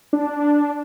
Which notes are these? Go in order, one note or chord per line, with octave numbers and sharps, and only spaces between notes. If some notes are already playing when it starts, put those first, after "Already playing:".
D4